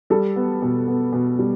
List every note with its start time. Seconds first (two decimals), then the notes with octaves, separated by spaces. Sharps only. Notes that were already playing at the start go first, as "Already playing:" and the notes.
0.10 G3 A4
0.36 B3
0.62 B2
0.88 B3
1.13 B2
1.39 G3